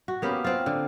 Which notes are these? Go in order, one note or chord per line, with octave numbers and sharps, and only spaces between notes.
F#4
A#3 B3 C#4 G4
C4 F4
D3